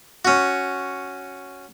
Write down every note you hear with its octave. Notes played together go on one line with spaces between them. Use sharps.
C#4 F#4